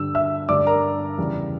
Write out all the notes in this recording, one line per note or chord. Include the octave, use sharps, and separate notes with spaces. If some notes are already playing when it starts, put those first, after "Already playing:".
Already playing: G2 D3 G3 E6
E5 E6
G2 D3 G3 D5 D6
A#4 A#5
E2 C#3 G3